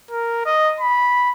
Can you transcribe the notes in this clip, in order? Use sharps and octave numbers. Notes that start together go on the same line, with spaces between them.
A#4
D#5
B5